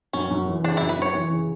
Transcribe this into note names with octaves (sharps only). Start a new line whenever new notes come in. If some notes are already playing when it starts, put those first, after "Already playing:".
F#2 C#4
F#2
E3
C#3 D4
E4
F#2
B4
F#2 C#5
E3
C#3